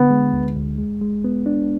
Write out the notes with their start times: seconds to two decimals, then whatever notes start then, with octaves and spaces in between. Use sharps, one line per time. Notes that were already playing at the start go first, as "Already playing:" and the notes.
Already playing: D3 B3
0.10 G#3
0.33 D2
0.56 D2
0.78 G#3
1.01 G#3
1.24 B3
1.46 D4